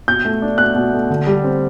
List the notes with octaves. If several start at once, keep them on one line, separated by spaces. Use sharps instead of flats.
B2 G6
A3
D4
B2 F#6
B2
A3
D3
G3
C4